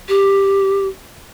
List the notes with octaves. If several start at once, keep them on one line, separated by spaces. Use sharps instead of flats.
G4